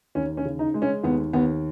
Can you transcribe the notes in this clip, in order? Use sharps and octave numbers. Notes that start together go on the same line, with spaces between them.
D#2 C#4
C#4
C#3
D#4
G#3
C#4
D#2 B3
D#2 B3